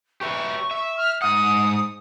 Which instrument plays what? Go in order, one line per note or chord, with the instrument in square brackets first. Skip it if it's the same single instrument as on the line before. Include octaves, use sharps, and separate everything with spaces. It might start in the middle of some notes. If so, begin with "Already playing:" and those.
[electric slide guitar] G4 B4 E5 [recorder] C#6
[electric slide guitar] E5
[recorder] F6
[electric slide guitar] G#2 F#5 [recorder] D#6